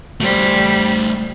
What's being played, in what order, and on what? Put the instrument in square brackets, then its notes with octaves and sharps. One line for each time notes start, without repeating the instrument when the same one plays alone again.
[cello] G3 [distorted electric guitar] A3 C5